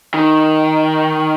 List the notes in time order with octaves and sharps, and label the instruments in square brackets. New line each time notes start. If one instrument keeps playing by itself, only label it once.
[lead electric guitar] D#3